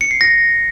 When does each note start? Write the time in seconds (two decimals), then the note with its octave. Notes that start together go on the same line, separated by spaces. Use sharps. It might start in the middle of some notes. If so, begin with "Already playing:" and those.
0.01 C#7
0.11 C7
0.21 A#6